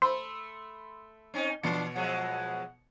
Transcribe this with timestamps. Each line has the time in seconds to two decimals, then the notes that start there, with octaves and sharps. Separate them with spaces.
0.02 A3 C5 B5 C6 E6
1.34 C4 C#4 D#4
1.63 B2 E3 B3 D4 C#7
1.96 F3 F#3 G#3 F#5